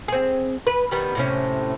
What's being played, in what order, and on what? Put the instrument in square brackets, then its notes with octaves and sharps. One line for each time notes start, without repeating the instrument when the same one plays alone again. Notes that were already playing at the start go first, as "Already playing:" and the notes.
[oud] C4 G#4
B4
D#3 G3 B3
A2 C3 C#4